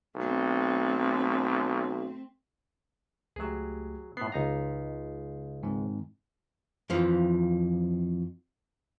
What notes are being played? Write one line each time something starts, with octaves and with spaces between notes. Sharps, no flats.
B1 A3 C4
C#2 F#3 A3 G4 G#4
A2 B3 C7
C#2 D#4 A#5
G#2 D#3 C4
F2 E3 F3